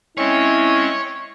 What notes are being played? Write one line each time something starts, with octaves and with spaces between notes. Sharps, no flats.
G#3 C4 C#4 E4 C#5